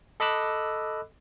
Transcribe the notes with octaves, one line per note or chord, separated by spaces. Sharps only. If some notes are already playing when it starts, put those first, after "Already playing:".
A4 D#5 B5 D6 E6 F#6